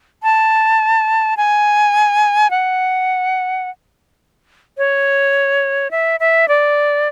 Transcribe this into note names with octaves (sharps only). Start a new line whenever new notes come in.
A5
G#5
F#5
C#5
E5
E5
D5